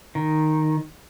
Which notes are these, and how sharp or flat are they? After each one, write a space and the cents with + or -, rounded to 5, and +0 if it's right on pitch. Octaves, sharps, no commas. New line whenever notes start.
D#3 -5